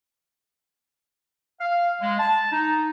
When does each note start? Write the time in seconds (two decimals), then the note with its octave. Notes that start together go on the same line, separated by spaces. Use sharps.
1.60 F5
2.01 G#3
2.19 A5
2.52 D#4